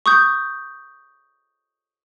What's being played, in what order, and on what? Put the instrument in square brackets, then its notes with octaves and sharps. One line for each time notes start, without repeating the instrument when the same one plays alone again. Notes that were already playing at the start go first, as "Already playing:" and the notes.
[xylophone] C#6 D#6 G6